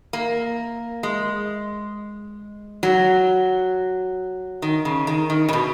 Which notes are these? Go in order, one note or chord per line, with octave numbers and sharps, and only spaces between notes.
A#3
G#3
F#3
D#3
C#3
D#3
D#3
C#3
B2